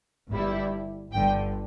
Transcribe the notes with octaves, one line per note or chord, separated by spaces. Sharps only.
G1 G2 G3 E4
G1 G2 D3 G5